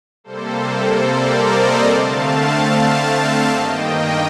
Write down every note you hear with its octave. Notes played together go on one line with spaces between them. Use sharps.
C3 G3 A#3 A4 C5
A4 C5
A#4 D5
C5 D#5
D3 A3 C4 F5 A5
G2 D#3 A#3 D#5 G5